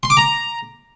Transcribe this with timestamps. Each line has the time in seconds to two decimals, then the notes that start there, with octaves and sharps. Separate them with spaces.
0.03 C6
0.10 D6
0.17 A#5